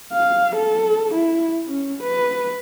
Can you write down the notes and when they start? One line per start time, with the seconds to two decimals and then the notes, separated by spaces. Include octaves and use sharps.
0.13 F5
0.56 A4
1.14 E4
1.68 C#4
2.03 B4